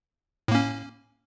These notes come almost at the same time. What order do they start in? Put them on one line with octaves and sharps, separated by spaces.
A2 A#3 C#4